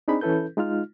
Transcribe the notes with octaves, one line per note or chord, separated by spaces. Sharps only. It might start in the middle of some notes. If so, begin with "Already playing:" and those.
C4 D4 D#4 G#4 B5
E3 C#4 E4 A4 B4 G6
G#3 D#4 F4 F6